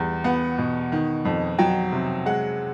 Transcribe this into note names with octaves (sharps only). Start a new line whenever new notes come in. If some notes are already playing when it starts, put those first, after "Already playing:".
Already playing: E2 G3
B3 F#5
B2
D#3
F2
F#3 G5
C3
G#3 F#5